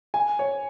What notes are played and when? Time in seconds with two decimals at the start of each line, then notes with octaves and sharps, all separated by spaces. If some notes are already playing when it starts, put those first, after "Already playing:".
0.14 G#5
0.39 C#5